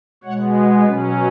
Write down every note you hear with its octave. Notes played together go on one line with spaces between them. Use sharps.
B2 G#3 B3 C#5 F#5
G#4
B2 F#3 C#4 B4